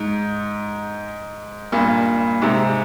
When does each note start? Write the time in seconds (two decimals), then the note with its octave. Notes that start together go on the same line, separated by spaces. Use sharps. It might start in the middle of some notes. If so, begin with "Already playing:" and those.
Already playing: G#2
1.72 G2 A#2
2.42 G#2 C3